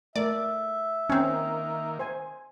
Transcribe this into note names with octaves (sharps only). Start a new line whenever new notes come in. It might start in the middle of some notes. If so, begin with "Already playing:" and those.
A3 A#4 D5 E5
D#3 A#3 C4 C#4
C5 G#5